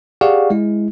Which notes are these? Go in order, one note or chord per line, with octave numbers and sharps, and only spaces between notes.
G4 G#4 D5 F5 F#5 C#6
G#3 E4